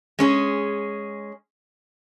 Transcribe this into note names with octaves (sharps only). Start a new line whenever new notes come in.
G#3 C#4 G#4